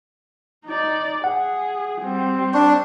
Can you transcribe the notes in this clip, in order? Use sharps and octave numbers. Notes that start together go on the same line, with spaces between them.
D#4 D5
G#4 F#5
G3 C4
D4 C#6